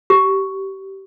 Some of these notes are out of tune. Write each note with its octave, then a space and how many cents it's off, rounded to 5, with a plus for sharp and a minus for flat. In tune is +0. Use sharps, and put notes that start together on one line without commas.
G4 -20